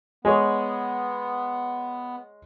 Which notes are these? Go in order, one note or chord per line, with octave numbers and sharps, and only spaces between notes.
G#3 B3 G#4 C#5